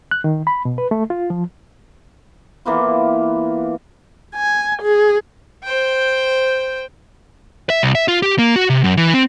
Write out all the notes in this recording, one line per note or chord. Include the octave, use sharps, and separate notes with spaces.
F#6
D#3
B5
B2
B4
A3
F4
F3
E3 A#3 B3 F4
G#5
G#4
C5 G5
E5
C2
E5
F4
G4
A#3
F#4
C3
F#2
E3
C4